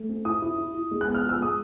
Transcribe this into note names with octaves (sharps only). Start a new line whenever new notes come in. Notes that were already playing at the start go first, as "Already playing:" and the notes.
Already playing: A3
C4
E4 D#6
E4
E4
E4
G#3
F#6
B3
F6
F3
E6
G#3 D#6